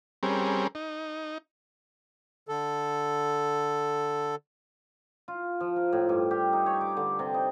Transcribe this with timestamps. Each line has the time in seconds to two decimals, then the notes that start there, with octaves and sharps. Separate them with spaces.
0.23 G3 C4 C#4 G#4 A#4
0.75 D#4
2.49 D3 A4
5.28 F4
5.60 F3
5.76 A#4
5.93 A2
6.09 G2
6.31 G4
6.53 D#4
6.66 C#5
6.81 D6
6.97 D3
7.19 C3
7.34 D#4